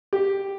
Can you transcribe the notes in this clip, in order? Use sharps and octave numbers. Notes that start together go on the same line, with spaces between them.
G4